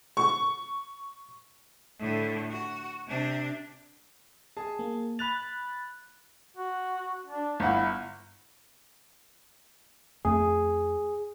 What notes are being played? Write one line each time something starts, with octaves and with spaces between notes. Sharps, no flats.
C#6
A2 D3
F#4
C3 D4
G#4 A5
A#3
B5 F#6 A6 F7
F#4
D4
G1 E4 F#5
F2 A3 G#4